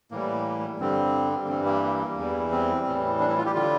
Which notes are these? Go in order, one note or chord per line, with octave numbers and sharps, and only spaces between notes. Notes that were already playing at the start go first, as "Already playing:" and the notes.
A2 E3 G3 A#3
G2 D3 G3 C4
A#3
G2 E3 G3 C4
A#3
A#3
E2 E3 G3
C4
A2 E3 G3
D4
E4
F4
G4
D3 G3 F4